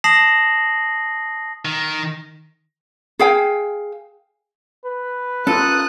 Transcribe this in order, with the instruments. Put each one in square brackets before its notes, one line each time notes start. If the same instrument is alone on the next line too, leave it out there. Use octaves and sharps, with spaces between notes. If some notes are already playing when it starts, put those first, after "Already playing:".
[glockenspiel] A5 D#6 A#6 C7 F#7
[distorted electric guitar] D#3
[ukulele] G#4 F5 G5 G#5
[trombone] B4
[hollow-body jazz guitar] C#4 F4 A#4 [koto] A4 [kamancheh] D#6 F#6